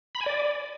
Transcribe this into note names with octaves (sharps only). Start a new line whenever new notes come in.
B5
G#5
D5